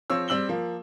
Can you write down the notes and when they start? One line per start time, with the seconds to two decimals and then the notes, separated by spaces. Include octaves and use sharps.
0.10 F3 C4 C#5 E6
0.28 G3 C4 E6 F#7 G7
0.49 F3 A#3